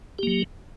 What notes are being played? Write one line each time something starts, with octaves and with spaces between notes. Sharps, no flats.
F#3 A#3 G4